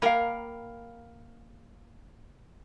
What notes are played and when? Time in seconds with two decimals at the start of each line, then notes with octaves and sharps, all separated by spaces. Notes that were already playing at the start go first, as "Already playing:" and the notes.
0.02 A#3 A#4 F5 G5 B5